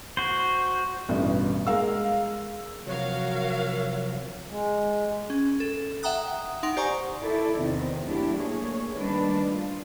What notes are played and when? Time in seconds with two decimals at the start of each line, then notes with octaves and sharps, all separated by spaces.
0.17 F#4 C5
1.09 A1 G2 B2
1.67 G#3 A#4 F5 E6
2.87 C3 F3 F#3 F#4 A#4 C#5 F5
4.49 G#3
5.30 C#4
5.60 A4
6.03 E5 F#5 G5 A#5 D#6 F#6
6.63 D#4 F#5 C6 D7 F7
6.77 G4 C5 D5 G#5 A#5 C#6
7.21 E4 A4 D5
7.58 E2 C3 D#3 C4
8.05 F#3 A3 D4 E4 G4
8.39 A3 A#3 G#4 C#5
8.95 D#3 G3 A3 D4 B4
9.51 F4